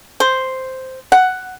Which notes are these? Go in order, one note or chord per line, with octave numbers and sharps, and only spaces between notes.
C5
F#5